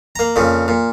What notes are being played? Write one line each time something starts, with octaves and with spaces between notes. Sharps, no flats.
A#3 A#5
F2 A#2 C#3
A#2